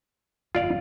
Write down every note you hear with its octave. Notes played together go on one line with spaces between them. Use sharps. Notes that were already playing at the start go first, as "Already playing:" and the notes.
G1 F2 F4 D5 F5